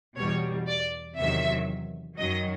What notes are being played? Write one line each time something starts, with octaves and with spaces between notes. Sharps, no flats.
E2 B2 G3 C#5
D5
E2 C3 D#3 F#3 E5
F#2 D#3 F#3 D#5